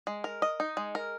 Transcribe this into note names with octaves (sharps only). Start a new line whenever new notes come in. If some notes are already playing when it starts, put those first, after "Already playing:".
G#3
A#4
D#5
D#4
G#3
A#4